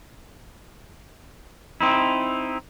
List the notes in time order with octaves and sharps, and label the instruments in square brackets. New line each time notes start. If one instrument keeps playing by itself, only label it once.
[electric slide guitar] C4 D#4 E4